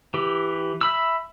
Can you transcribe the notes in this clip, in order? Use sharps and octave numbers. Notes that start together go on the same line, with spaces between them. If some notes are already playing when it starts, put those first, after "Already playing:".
E3 G4
E5 B5 E6